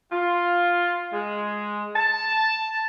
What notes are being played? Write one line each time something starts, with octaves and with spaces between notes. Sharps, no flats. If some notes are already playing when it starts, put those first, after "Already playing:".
F4
G#3
A5